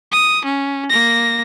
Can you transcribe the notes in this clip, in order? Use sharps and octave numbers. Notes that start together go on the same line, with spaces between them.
D#6
C#4
A#3 A#6